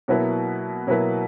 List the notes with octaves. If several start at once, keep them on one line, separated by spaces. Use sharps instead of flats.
B2 F#3 A#3 E4 B4
B2 F#3 A#3 E4 B4